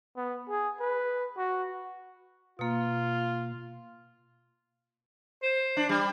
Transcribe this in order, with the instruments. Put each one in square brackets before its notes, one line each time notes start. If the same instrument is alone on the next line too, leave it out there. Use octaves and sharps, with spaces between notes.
[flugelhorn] B3
G#4
B4
F#4
[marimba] B2 A#3 [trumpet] F4
[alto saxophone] C5
[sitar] D4
G3